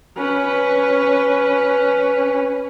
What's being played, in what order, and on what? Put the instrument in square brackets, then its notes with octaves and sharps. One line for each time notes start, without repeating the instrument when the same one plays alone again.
[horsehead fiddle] C#4 B4